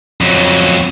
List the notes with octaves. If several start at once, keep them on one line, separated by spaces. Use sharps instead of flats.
F2 F#3